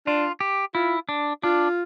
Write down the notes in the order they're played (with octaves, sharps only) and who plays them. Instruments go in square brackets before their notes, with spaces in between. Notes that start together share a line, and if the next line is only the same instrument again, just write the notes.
[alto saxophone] D4 [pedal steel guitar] F4
[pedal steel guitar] G4
[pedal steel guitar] E4 [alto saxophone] F4
[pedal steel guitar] D4
[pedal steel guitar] D4 [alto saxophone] F4